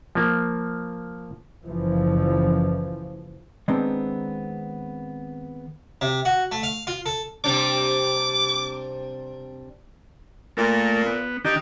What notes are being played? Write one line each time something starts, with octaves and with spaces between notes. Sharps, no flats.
F3 A#3
F#1 E3 F3
D#3 G#3 B3 C4 D4 D#4
C3
F#4
A3
F5
F4
A4
C3 G3 D4 D6
A#2 A3 A#3
B3
D#3 D4 D#4 G4